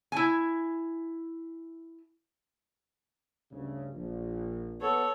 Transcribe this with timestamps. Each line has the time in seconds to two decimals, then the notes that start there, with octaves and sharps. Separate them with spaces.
0.12 E4 G#5
3.51 D2 G2 C#3
3.93 A#1
4.81 B3 A4 C#5